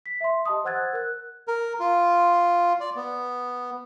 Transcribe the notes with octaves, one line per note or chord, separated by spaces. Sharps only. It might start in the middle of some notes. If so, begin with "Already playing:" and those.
B6
E5 C6
G4 D#5 A5 C6 D#6
C5 F#5 E6 F#6 G#6 A6
A#4 F#6
A#4
F4
D5
B3